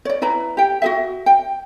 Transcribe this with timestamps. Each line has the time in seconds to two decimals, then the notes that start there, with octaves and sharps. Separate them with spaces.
0.05 C#5 D5
0.22 E4 B4 D5 A#5
0.57 G4 G5
0.82 F#4 G#4 E5
1.26 G5